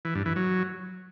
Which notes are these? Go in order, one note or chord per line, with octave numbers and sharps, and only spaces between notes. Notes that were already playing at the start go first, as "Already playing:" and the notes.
E3
G2
E3
F#3